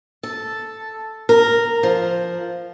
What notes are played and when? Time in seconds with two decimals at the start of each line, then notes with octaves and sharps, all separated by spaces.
0.23 A4
1.29 A#4
1.83 F3